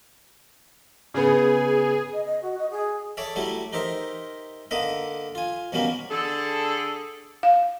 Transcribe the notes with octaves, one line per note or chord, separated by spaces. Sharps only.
C#3 B3 G#4
D#5
D#5
F#4
D#5
G#4
A4 C#5 D5 E5
F#3 G3 A3 E4 G4
D#4 G4 A#4 C5 E5
D3 A#3 B4 D#5 E5
F4 G#5
B2 F#3 G3 A#3 C#4 B5
D3 G#4 A4
F5